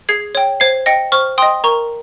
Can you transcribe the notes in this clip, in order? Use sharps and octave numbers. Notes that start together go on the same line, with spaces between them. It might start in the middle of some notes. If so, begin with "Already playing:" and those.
G#4 G#6 C7
C#5 G5
C5 G#6 C7
D#5 G5 A#6 C#7
C5 C#6 F6
D#5 G5 C6 D#6
A#4 A#5 C#6